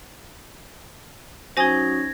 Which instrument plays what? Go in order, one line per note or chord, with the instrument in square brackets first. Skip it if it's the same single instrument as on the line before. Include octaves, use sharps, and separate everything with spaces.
[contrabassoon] F#3 [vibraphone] C#4 D#4 [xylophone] C5 G#5 D#6 [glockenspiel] G#6 A#6